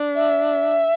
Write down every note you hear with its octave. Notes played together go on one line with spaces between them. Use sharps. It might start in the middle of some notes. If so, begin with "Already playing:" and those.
Already playing: D4
E5